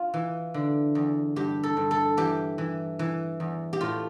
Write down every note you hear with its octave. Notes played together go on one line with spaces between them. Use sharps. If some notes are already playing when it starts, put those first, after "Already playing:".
Already playing: F4
E3
D3
E2
G2 G4
A4
G2
A4
E3 G4
E3
E3
E2
G4
A2 F4